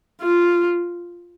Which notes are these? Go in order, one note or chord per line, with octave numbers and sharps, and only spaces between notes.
F4